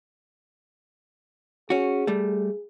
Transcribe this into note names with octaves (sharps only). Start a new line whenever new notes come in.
C#4 F#4 G#4
G3 A3